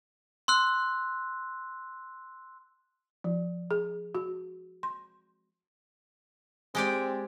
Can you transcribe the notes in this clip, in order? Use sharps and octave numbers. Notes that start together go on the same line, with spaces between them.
C6 E6 F#6
F3
G#4
F#4
C6
G#3 C4 G4 D5